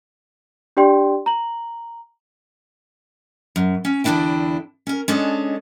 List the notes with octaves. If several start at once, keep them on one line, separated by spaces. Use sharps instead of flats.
D4 G4 D5 G5 C6
A#5 F#7
F#2
C#4
E2 D3 C4 D4 E4 G5
C#4 A#4
G#3 C#4 D4 A4 C#5 D#5